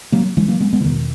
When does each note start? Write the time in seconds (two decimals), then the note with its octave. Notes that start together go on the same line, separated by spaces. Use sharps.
0.12 F#3 A#3
0.37 E3 G#3
0.48 F#3 A#3
0.60 G#3 B3
0.73 G#3 B3
0.81 E3
0.84 E2 B2 D#3